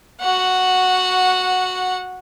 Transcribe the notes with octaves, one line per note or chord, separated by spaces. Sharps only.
F#4 F#5